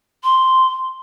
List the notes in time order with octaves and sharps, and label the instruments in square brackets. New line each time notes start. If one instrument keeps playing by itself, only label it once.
[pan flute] C6